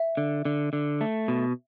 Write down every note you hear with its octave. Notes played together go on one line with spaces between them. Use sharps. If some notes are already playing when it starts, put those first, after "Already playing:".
Already playing: E5
D3
D3
D3
A3
B2